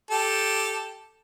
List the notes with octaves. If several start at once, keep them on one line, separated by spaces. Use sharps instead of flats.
G4 A4